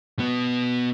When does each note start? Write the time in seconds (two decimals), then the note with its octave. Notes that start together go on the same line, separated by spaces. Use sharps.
0.19 B2 B3